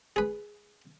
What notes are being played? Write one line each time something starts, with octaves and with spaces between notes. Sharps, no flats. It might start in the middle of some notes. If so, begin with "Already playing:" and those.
G#4 B4